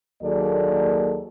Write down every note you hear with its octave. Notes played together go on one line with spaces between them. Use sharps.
D#2 F#3 A#3 G#4 A4 D5